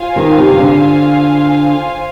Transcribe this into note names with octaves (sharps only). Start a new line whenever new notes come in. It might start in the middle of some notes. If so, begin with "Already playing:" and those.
Already playing: F4 C5 F5 G#5
D#3
C3
D#3
D3